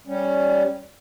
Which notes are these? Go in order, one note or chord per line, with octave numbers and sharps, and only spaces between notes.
G3 C#4